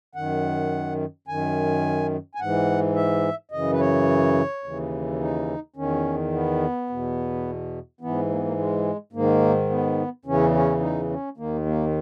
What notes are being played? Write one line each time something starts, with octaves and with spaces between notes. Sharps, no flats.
F#2 D#3 F#5
F#2 D#3 G#5
G#5
G#2 E3 F#5
E5
F#2 C#3 E3 D#5
B4
C#5
D#2 C#3 E3
D#4
E2 D#3 C#4
B3
E2 B2
G#2 E3 B3
A#3
B3
A#3
G#3
G#2 D#3 A#3
B3
E2 C#3 E3 C#4
C#4
D#4
C#4
D#2 D#3 A#3
A#3